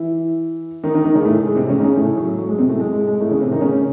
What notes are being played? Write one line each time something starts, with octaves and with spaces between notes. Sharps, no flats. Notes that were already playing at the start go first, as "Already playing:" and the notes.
Already playing: E3 E4
D#3 D#4
D#3 D#4
D#3 D#4
C#3 C#4
A2 A3
G#3
C3 C4
C#3 C#4
D#4
C#3 C#4
A2 A3
F#3
F#3
G#3
C3 C4
A2 A3
G#3
G#3
G#3
A2 A3
C#3 C#4
C3 C4
D#3 D#4
C#3 C#4